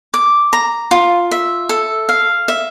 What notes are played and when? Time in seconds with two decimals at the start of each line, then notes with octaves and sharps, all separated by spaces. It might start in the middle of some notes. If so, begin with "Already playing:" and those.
0.14 D6
0.53 A#5
0.91 F4
1.31 E5
1.69 A4
2.09 F5
2.48 E5